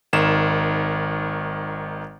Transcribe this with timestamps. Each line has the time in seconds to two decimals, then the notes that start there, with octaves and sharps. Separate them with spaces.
0.13 G#1 D#3 E7